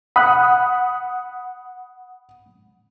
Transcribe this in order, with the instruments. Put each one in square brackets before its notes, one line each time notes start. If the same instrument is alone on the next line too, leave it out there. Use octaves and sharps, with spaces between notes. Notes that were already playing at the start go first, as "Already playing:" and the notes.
[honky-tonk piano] F#5 D#6 [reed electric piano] B5 F#6